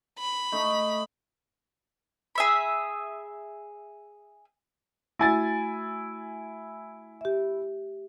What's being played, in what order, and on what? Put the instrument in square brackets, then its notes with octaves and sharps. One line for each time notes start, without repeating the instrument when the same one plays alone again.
[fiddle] B5
[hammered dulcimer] A3 D#4 D#5
[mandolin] G#4 E5 B5
[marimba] A3 F#4 [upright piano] E4 G#5 A6
[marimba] G4 E5